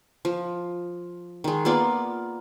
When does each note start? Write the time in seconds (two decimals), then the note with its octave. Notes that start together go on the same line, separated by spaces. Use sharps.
0.25 F3
1.44 D#3 G#3
1.65 A#3 B3 F4 D5